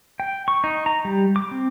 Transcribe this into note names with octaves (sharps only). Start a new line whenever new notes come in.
G5
C#6
D#4
A#5
G3
D6
C4